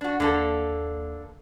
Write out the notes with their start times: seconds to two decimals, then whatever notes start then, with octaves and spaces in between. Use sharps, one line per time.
0.01 D4 F#4
0.20 D#2 D3 A#3 A4